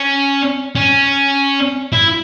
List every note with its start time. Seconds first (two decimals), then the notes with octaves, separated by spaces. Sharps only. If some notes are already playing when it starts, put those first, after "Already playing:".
Already playing: C#4
0.75 C#4
1.93 E4